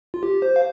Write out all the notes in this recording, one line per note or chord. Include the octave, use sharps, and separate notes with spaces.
F4
G4
C5
F5